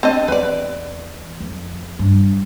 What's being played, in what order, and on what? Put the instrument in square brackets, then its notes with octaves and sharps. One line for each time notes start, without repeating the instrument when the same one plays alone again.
[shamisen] C4 D4 D#5
[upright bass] E2 [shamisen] B4 D5
[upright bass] F2
G2